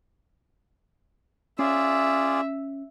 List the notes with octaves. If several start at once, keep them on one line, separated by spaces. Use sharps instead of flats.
C#4 F4 G#4 D5 E5